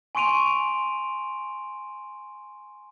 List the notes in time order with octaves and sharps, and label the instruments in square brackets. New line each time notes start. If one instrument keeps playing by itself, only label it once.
[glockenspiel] G#5 C6 C#6 D7 D#7 F7